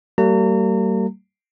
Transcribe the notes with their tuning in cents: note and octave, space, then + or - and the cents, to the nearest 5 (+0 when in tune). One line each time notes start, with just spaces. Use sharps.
G3 -35 A#3 -45 A#5 -40